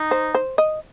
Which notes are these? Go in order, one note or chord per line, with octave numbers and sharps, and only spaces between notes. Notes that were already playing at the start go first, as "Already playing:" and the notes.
Already playing: D#4
C5
C5
D#5